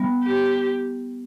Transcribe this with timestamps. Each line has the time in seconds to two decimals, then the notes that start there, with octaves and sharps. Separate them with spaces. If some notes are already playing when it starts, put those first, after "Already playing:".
Already playing: G3 B3
0.24 G4